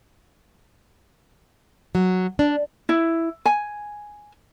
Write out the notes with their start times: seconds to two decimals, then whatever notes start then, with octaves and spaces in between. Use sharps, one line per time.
1.95 F#3
2.39 D4
2.89 E4
3.46 G#5